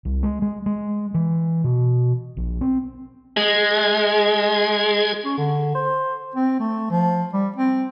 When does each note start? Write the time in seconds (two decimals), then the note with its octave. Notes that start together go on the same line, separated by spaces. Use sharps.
0.05 C2
0.23 G#3
0.42 G#3
0.66 G#3
1.14 E3
1.64 B2
2.37 A#1
2.61 C4
3.37 G#3 G#4
5.25 C#4
5.38 D3
5.75 C5
6.35 C4
6.60 A3
6.91 F3
7.33 G3
7.56 C4